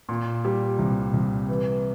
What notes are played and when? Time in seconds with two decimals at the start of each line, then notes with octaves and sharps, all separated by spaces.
0.09 A#2
0.45 G3
0.79 C2
1.13 C2
1.48 E3